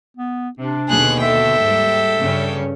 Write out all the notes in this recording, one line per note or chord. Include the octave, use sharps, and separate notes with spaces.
B3
C3 D4
D#2 B2 D3 G#4 F#6
A4 E5 G5
G#2 G3
G2 C#3 C#4